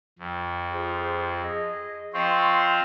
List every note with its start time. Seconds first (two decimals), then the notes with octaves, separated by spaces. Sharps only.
0.19 F2
0.72 F4 G#4 C5
1.43 G#4 D#5
2.14 F3 C4 F4 D#5 C6 C#6